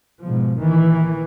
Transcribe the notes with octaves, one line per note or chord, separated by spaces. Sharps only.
G#2 B2 F3
A#1 D#3 E3